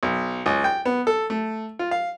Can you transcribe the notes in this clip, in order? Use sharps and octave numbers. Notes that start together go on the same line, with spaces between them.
B1
C#2
G5
B3
A4
A3
F4
F5